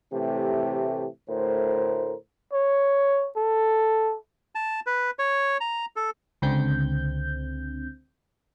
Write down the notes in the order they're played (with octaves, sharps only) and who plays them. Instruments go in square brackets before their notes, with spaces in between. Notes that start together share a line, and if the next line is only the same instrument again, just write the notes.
[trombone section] A2 C3 E3 A3 G4
D2 A2 A#4 C5
[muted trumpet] C#5
A4
[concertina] A5
B4
C#5
A#5
A4
[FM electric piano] C#2 D3 C4 G6